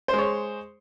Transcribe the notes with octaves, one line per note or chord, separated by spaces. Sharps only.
G#3 C5 C#5